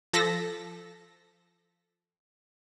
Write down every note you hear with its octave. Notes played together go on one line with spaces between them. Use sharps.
F3 A4 A#6 B6